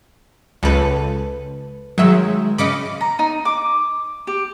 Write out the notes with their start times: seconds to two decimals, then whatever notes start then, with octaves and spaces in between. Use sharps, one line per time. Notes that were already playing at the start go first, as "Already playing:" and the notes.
0.63 C#2 A4 B4
1.98 D#3 F#3 G#3 E5
2.58 C#3 C#4 D#5 B5 D6
3.01 A#5
3.19 D#4
3.45 D6
4.27 G4